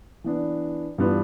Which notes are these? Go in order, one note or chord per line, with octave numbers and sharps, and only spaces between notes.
E3 B3 D4
G2 E3 B3 D4 F4